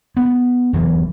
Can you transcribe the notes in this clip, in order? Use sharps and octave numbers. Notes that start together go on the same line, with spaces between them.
B3
E1 B1 E3